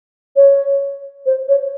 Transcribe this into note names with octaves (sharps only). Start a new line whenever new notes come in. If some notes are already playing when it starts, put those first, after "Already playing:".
C#5
C5
C#5